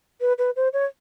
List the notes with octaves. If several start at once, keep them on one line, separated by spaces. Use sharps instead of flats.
B4
B4
C5
C#5